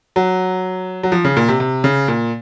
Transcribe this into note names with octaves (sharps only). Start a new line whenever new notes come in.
F#3
F#3
F3
C#3
A#2
C3
C3
C#3
A#2